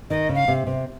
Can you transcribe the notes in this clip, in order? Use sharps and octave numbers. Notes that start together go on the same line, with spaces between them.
D#3 D#5
C#3
F5
C3
C3